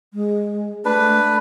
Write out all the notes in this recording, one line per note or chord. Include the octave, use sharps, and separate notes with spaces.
G#3
A3 D4 B4